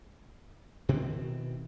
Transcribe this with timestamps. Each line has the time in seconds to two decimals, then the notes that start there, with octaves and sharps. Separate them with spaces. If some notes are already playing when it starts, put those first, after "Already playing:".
0.89 B2 D#3 E3 C4